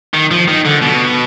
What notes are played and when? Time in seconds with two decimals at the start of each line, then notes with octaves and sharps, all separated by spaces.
0.14 D#3
0.31 F3
0.48 D#3
0.65 D3
0.82 B2